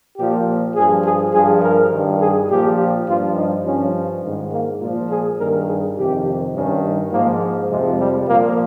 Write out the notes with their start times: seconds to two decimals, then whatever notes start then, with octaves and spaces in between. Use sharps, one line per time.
0.17 A#2 F3 G4
0.75 G2 F3 G#4
1.04 G#4
1.33 G2 F3 G#4
1.62 A#4
1.91 G2 D#3
2.20 G#4
2.49 A#2 F3 G4
3.07 G2 F3 F4
3.36 D#4
3.64 G2 F3 C#4
4.23 G#2 D#3
4.52 A#3
4.80 A#2 F3 F4
5.09 G#4
5.38 G2 D#3 A#4
5.68 G#4
5.96 F2 C3 D#3 G4
6.54 G2 D#3 C#4
7.12 G#2 F3 A#3
7.70 F2 C3 F3 G#3
7.99 G3
8.27 A#2 F3 A#3